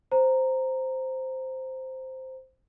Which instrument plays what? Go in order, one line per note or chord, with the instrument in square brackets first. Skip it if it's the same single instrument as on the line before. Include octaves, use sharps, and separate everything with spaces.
[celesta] C5 A#5